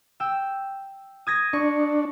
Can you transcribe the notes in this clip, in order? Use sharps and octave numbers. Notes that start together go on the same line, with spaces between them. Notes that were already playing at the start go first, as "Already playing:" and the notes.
G5 E6
D#6 G#6 A#6
D4 C#6